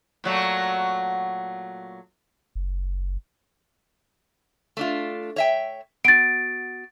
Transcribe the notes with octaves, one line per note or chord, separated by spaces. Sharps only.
A#2 F#3 A3
F#1
A3 D4 F4
C#5 E5 G5
B3 F#4 A6 D7